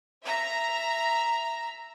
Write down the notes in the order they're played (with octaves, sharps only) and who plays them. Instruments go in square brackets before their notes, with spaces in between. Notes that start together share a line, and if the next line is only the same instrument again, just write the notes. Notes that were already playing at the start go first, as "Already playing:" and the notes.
[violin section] E5 A#5